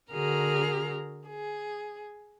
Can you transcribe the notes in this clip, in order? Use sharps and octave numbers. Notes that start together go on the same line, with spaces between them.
D3 F#4 G#4 A#4 A#5 F6
G#4